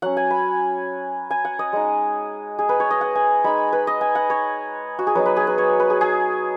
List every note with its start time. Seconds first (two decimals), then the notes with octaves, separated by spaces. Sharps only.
0.02 F#3 C#4 F#5
0.17 G#5
0.30 B5
1.30 G#5
1.45 F#5
1.59 D#5
1.73 G#3 D#4
2.59 G#4
2.69 B4
2.80 C#5
2.90 D#5
3.01 F#5
3.15 G#5
3.44 G#3 D#4 B5
3.73 B4
3.87 D#5
4.01 G#5
4.15 F#5
4.30 C#5
4.99 F#4
5.07 G#4
5.15 F#3 B3 D#4 B4
5.26 B4
5.36 G#4
5.47 B4
5.58 C#5
5.80 B4
5.90 G#4
6.01 G#4